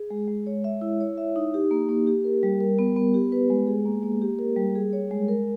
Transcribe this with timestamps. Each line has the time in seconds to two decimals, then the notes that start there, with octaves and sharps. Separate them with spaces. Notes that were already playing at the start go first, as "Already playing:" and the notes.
Already playing: G#4
0.10 G#3
0.28 G#3
0.47 C#5
0.64 E5
0.81 E4
1.01 C#5
1.18 E5
1.36 D#4
1.54 G4
1.71 A#3
1.89 A#3
2.07 G4
2.24 A#4
2.43 G3
2.60 A#4
2.79 B3
2.96 B3
3.14 G4
3.32 B4
3.50 G#3
3.67 G#4
3.86 A#3
4.03 A#3
4.22 G4
4.39 A#4
4.56 G3
4.75 G#4
4.93 C#5
5.11 G#3
5.28 A#4